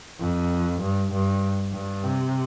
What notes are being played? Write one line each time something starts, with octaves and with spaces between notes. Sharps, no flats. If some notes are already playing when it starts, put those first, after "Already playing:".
F2
G2
G2
G2
C3